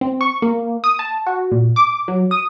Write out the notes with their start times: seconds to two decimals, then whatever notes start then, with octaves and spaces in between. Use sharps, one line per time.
0.01 C4
0.21 C#6
0.42 A#3
0.84 D#6
0.99 A5
1.26 F#4
1.51 A#2
1.76 D6
2.08 F#3
2.31 D#6